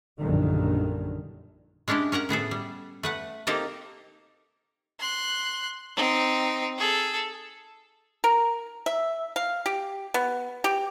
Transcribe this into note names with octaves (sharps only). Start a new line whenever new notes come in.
A#1 F#2 D3 D#3 G3
G#3 C#4 D4 E4 G4
C#4 A#4 F#5 A#5
A2 B3 G#4 A4
G3
A3 B4 F#5
A#3 C4 D#4 G4 A4 D#5
C6 F#6
C4 D#4
G#4 A4
A#4
E5
F5
G4
B3
G4